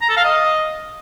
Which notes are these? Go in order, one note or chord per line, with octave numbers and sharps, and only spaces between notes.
A#5
A4
F5
D#5